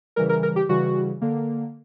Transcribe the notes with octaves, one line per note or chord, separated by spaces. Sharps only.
C#3 E3 G3 A#4
A#4
A#4
G4
C#3 E3 G3 F#4
D3 A#3